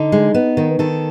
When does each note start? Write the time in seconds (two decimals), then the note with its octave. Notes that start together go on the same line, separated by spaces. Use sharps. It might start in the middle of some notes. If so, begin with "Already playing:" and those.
Already playing: D3 D#4
0.12 G#3
0.34 B3
0.57 D#3
0.79 D#3 A4